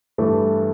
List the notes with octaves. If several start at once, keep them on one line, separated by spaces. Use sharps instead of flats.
G2 E3 A3